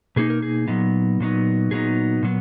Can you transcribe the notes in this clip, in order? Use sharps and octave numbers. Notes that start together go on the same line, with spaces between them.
B2 A#3 D#4 G#4
A#4
G#4
A#2 F#3 B3 D#4
A#2 F#3 B3 D#4
A#2 F#3 B3 D#4 G#4
A#2 F#3 B3